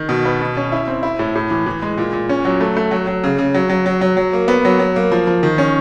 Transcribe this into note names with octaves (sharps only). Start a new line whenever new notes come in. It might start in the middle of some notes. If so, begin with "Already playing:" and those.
Already playing: D#3
B2
B3
B2
C#4
E4
C4
E4
A2
A2
E3
E3
G#3
A#2
A#2
C#4
F#3
A3
A3
F#3
F#3
C#3
C#3
F#3
F#3
F#3
F#3
F#3
A#3
B3
F#3
F#3
A#3
F3
F3
D#3
C#4